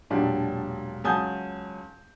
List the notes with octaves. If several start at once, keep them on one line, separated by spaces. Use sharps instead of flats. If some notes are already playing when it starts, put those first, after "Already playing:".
E1 A#2 F#3 D4 G4
C#2 F#3 G#5 A5 D#6 G6